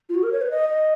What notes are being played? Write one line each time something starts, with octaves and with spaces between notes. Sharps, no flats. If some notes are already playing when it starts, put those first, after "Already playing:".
F4
F#4
A#4
C#5
B4
D#5
D#5